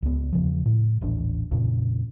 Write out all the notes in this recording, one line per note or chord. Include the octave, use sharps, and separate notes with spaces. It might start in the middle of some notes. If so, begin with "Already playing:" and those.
C#2 B3
E2 C#3 F3
A2
D#1 A1 D4
F2 A#2 C#3